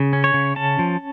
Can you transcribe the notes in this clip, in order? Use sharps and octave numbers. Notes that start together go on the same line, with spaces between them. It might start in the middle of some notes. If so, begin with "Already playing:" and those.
Already playing: C#3
C#4
C#5
C#3
C#4 A5
F3